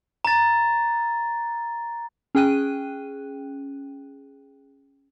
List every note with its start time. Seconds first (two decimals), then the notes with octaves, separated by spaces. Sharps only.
0.25 A#5 A6
2.35 C#4 G#4 G5 F#6 D#7